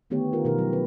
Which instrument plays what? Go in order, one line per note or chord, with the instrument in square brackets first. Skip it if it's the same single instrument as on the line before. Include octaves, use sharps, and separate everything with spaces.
[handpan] D3 D#3 A3 B3 G4 C#5
D#3 F4 A#4
B2 D#3 F3 A#4
F#3
B4